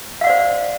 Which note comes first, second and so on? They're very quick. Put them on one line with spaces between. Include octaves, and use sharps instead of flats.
F5 F#5 D5 C5